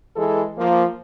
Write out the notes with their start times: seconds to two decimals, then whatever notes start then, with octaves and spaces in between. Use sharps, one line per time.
0.16 E3 G#3 G#4 A4
0.58 F3 A#3